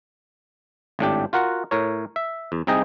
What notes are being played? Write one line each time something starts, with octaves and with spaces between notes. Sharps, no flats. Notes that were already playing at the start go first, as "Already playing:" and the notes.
G#1 A2 D4 G4
F4 F#4 A#4 F#5
A2 A#4 C#5
E5
E2
C2 C3 D#4 G#4 D#5 G5